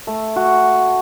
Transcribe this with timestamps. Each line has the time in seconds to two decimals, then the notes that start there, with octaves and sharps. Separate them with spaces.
0.07 A3
0.36 F#4